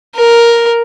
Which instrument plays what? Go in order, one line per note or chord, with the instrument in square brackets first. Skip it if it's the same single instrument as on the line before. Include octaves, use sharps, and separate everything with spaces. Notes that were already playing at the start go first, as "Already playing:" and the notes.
[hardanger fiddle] A#4